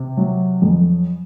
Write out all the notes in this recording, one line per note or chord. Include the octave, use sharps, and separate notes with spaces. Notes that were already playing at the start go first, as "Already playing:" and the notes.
Already playing: C3
F#3
F2